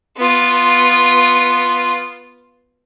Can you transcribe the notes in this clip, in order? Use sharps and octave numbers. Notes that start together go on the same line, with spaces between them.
B3 F4